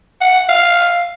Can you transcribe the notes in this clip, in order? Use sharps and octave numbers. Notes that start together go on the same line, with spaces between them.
F#5
F5